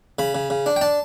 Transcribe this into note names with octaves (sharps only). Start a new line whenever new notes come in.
C#3 B5
C#3
C#3
D4
G5
D4 A5